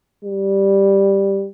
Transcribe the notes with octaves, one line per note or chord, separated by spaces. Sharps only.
G3